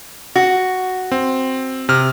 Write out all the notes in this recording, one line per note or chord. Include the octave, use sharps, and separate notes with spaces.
F#4
C4
C3 F6